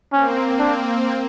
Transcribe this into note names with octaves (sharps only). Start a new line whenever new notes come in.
A#3 C4 C#4
D4